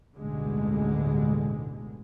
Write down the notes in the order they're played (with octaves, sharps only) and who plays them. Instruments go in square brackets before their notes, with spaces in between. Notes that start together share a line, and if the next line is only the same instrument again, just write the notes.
[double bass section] A1 D2 G2 B2 D3 G#3